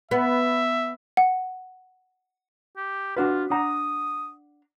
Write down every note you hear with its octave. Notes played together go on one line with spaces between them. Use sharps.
B3 E5
F#5
G4
D4 F4 F#4 B4
D4 F#5 A#5 D#6